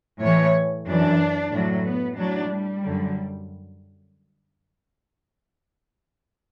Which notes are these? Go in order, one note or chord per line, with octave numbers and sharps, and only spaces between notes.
A2 E3 C#5
F#2 E3 D4
A2 F#3
B3
A2 F#3 D4
G3
F#2 D3 F#3